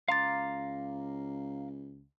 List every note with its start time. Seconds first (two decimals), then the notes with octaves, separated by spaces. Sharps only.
0.08 C#2 F5 A#5 C6 D6 A6